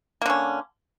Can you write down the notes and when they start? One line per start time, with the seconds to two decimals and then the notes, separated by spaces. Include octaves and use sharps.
0.22 A#3
0.26 D3
0.30 C#4